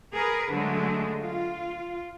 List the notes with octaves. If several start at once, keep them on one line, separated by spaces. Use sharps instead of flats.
G#4 A#4 B4
D3 F#3 G#3 A3
F4